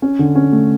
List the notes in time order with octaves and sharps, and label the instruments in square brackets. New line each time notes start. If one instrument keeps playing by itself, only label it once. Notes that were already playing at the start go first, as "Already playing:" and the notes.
[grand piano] C#4
D3
C#4
A3